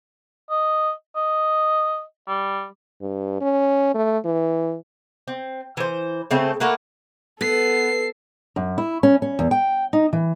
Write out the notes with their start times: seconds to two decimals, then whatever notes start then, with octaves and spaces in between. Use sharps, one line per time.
0.50 D#5
1.16 D#5
2.28 G3
3.01 G2
3.41 C#4
3.95 A3
4.25 E3
5.28 C4
5.77 E3 C5
6.31 C#3 A3 C4
6.60 A3 A#3 F#4 B4
7.41 B3 A4 C7
8.56 F#2
8.78 E4
9.03 C#4
9.22 C#4
9.39 E2
9.51 G5
9.93 D#4
10.13 E3